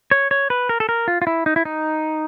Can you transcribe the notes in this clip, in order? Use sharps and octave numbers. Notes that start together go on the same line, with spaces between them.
C#5
C#5
B4
A#4
A4
A#4
F4
F4
E4
D#4
E4
D#4